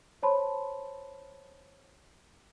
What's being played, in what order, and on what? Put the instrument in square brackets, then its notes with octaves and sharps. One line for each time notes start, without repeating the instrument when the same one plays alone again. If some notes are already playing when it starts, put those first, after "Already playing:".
[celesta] C5 C#5 A5 B5 C6